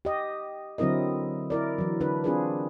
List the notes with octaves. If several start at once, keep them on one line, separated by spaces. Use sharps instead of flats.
G4 D#5
D3 F#3 C4 E4 A#4 D#5
E4 A#4 D5
E3 F#3
D3 D4 B4
C4 D4 F4 G#4 A#4 B4